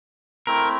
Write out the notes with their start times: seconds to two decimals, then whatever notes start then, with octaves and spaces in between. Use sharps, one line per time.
0.47 A3 C4 E4 A#4